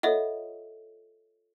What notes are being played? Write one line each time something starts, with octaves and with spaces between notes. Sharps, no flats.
F4 A4 C#5 D#5 E5 F#5